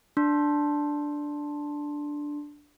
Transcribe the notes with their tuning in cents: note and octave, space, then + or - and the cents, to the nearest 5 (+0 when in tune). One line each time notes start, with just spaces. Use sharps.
D4 +0 C6 +15